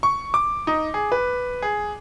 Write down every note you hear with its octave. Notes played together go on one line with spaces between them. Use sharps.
C#6
D6
D#4
G#4
B4
G#4